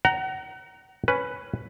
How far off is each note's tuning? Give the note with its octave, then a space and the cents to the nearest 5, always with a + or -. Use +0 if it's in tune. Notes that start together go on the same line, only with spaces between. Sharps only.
F#5 +35 A#5 +0
C#4 +0 B4 +5